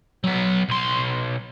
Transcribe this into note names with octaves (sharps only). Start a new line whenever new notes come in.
F#3 B3
B1 C6